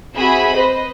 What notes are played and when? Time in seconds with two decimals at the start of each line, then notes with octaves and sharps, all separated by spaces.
0.15 C4 F#4 G#4 E5 B5
0.54 B4 C5 D#5